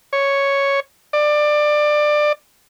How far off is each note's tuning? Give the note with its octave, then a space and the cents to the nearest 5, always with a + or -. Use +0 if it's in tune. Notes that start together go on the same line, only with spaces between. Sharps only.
C#5 +0
D5 +20